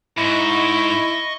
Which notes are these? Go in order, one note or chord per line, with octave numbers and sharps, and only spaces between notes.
G#2 E4 D#5 C#6